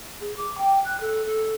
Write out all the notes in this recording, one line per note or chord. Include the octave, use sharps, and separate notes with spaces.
G#4
D6
G5
F#6
A4
A4